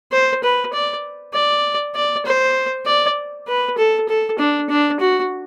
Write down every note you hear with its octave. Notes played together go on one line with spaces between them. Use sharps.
C5
B4
D5
D5
D5
C5
D5
B4
A4
A4
D4
D4
F#4